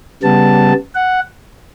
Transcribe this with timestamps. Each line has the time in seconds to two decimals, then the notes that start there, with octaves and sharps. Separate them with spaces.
0.23 C#3 G3 B3 A5
0.95 F#5